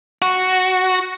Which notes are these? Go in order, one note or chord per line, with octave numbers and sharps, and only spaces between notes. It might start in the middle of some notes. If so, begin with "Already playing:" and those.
F#4